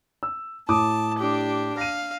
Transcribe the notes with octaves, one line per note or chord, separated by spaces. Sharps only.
E6
A2 A5 D6 D#6
D4 G4
F5 A#6 D#7